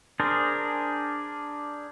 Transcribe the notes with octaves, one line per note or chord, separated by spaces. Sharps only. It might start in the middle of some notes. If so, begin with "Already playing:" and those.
D4 G#4 A#4 C5